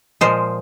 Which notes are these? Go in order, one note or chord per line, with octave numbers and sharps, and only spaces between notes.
A#2 F3 G#3 C5